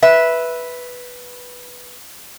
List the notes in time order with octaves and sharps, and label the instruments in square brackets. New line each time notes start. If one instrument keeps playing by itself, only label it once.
[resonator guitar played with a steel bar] B4 E5